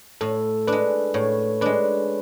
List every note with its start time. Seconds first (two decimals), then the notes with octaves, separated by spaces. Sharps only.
0.21 A2 A4
0.68 G#3 D4 B4
1.14 A2 C#5
1.61 G#3 D4 B4